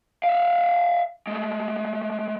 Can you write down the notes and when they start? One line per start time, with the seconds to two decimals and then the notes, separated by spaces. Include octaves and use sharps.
0.24 E5 F5
1.27 G#3 A3